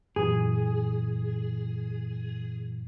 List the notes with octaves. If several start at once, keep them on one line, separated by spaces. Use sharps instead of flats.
F#2 A#2 E3 G#4